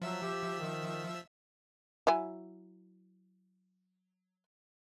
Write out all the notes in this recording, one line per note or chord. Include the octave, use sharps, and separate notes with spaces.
F3 F#3 E5 E6
G4
D#3
F#3 E4 G#5